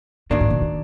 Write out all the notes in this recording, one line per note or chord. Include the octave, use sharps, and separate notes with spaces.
G#2 D#3 F#3 A#3 D4
A2
B2
C#3